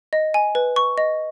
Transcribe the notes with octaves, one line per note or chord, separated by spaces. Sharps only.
D#5
G#5
B4
C#6
D#5